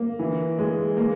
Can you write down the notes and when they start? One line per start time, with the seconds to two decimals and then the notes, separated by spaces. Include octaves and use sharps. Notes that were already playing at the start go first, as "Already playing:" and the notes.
Already playing: A#3
0.19 E3
0.59 G#3
0.97 A#3